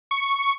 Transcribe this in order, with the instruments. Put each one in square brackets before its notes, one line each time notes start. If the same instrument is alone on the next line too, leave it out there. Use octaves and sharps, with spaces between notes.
[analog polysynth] C#6